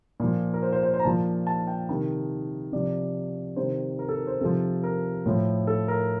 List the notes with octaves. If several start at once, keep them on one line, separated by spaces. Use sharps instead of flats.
A#2 F3
A#4
C5
C5
C5
C5
A#5
A#2 F3 A5
A5
G5
C3 D#3
C3 F3 D5
C3 D#3 C5
A#4
A4
A#4
C5
C3 F3 A4
A#4
A2 F3
A4
A#4